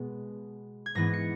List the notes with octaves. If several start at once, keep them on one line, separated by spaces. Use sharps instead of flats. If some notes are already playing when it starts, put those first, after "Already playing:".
Already playing: B2 G#3 B3
G#6
G#2 E3 B3 A#6
C#7